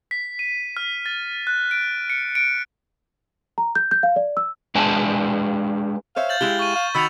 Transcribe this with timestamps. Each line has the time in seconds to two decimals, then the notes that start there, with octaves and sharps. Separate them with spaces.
0.11 B6
0.39 D#7
0.77 F6
1.06 A6
1.47 F#6
1.71 D7
2.10 C#7
2.35 D7
3.58 A#5
3.75 G6
3.91 G6
4.03 F5
4.16 D5
4.37 E6
4.75 G#3 D4 B4 D5 G#5 A5
6.16 C5 C#5 E5 F5
6.29 G6 A6 F#7
6.41 G#3 E4 G4 G7
6.59 C#6 D#7
6.75 F5
6.95 D#3 F#4 B5 E6 C#7 F7